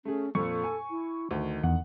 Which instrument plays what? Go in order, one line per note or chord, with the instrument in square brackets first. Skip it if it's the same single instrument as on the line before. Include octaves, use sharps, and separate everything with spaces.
[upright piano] A3 G#4 [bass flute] C#4
[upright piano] F2 A#2 [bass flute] A4 [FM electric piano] C#6
[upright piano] G#5
[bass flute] E4
[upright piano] D2 [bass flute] D#3
[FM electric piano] E2 [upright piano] F#5